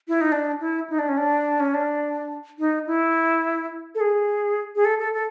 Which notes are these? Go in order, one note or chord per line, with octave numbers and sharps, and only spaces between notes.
E4
D#4
D4
E4
D#4
D4
C#4
D4
C#4
D4
D#4
E4
A4
G#4
G#4
A4
A4
A4